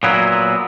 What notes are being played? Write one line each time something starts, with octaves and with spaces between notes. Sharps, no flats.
A#2 F#3 B3 E4